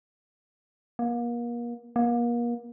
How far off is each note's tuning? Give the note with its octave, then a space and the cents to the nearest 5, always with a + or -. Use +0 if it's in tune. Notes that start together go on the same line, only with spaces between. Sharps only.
A#3 +35
A#3 +35